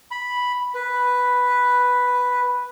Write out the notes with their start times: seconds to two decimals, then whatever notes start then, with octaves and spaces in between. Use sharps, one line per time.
0.11 B5
0.75 B4